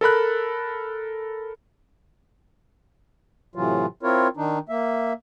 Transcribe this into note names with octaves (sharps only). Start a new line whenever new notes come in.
A4 A#4 B5 F#6
A2 C3 E3 F#3 F4
C4 E4 F4 A#4 C#5
D#3 D4 D#4
A#3 E5